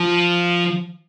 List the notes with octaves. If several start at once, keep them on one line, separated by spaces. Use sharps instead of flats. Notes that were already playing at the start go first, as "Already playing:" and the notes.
Already playing: F3